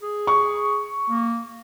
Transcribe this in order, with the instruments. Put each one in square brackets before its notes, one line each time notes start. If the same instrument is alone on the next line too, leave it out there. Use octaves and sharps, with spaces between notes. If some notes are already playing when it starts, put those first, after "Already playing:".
[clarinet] G#4
[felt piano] C#6
[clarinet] A#3